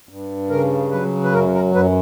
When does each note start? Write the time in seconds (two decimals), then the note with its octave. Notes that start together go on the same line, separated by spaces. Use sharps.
0.09 G2
0.50 C#3 A#4
0.91 F#3 B4
1.24 B4
1.32 F#2 A#4
1.54 A#4
1.75 F#2 B4